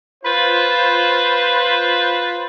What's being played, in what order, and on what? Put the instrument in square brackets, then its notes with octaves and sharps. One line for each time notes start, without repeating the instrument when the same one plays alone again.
[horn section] F4 B4 C5